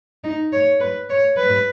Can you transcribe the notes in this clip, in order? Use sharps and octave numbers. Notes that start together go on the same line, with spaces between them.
D#4
C#5
B4
C#5
B4